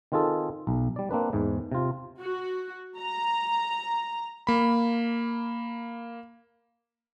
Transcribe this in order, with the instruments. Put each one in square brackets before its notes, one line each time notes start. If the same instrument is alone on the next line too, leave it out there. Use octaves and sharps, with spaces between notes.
[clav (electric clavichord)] D#3 C4 F4 G#4 A4
B1
G3 D5
A#3 C4 D4 B4
E2 G#2 E3
C3 F4
[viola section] F#4
A#5
[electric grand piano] A#3 B5